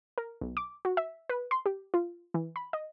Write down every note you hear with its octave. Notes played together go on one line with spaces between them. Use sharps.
A#4
B1
D6
F#4
E5
B4
C6
G4
F4
E3
B5
D#5